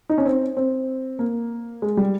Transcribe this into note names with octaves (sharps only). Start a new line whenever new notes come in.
D#4
C#4
C4
C4
A#3
G#3
G3